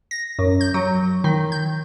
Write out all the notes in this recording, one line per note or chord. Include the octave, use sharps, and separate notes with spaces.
A#6
F#2
G6
F#3
D#3
G6